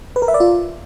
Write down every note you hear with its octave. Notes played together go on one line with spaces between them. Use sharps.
B4
A#4
E5
D5
F4